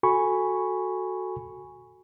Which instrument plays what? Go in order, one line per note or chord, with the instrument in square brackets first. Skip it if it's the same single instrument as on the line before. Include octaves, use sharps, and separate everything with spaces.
[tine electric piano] F#4 A4 G#5 B5 C#6